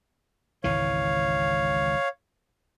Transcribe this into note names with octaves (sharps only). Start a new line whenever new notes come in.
G#1 C#2 E3 C#5 F5